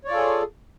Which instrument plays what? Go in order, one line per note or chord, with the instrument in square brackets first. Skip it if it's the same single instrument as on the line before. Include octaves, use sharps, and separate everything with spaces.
[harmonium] C#5
D5
F4
A4
G#4